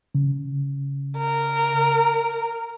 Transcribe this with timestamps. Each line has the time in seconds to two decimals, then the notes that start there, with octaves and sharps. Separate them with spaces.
0.15 C#3
1.18 A#4